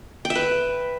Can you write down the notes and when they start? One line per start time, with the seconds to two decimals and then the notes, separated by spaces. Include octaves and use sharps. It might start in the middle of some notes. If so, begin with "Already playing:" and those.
0.25 G5
0.30 E5
0.35 B4